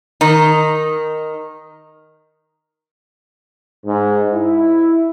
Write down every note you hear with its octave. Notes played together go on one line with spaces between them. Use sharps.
D#3 D#4
G#2
E4